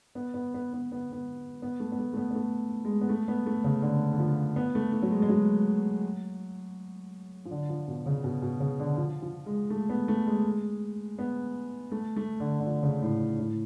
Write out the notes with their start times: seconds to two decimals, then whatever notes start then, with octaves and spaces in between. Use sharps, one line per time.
0.15 B3
0.34 B3
0.54 B3
0.73 B3
0.92 B3
1.12 B3
1.62 B3
1.80 A3
1.92 B3
1.99 A3
2.13 A3
2.17 B3
2.31 B3
2.35 A3
2.85 G#3
3.01 B3
3.09 A3
3.28 B3
3.46 A3
3.64 C#3
3.82 D3
4.13 D3
4.19 F3
4.56 B3
4.75 A3
4.92 A3
5.02 F#3
5.11 G#3
5.22 G#3
5.29 F#3
7.45 F3
7.51 D3
7.69 F3
7.88 B2
8.06 C#3
8.24 B2
8.42 B2
8.60 C#3
8.80 D3
8.97 F3
9.22 F3
9.46 G#3
9.70 A3
9.89 B3
10.08 A3
10.27 G#3
11.19 B3
11.92 A3
12.16 A3
12.40 D3
12.60 D3
12.66 F3
12.83 C#3
13.02 A2
13.39 A2